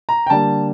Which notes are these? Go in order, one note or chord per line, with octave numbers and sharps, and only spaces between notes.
A#5
G5
D3 G3 A#3 A5